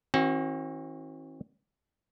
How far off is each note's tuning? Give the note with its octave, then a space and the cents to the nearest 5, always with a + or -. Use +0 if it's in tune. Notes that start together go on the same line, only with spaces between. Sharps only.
E3 -45 C4 +45 F#4 +0